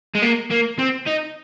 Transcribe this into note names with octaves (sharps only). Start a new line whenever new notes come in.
G#3
A#3
A#3
C4
D#4